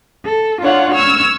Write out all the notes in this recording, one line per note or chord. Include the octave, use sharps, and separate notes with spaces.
A4
D4 F4 C#5 F5 F#5
C#6 E6 F6 G#6